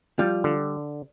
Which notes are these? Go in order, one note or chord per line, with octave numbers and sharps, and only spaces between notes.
F3 G3 F4
D3